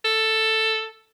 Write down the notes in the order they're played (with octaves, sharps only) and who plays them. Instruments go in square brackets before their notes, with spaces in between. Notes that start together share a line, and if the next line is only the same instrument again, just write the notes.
[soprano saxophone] A4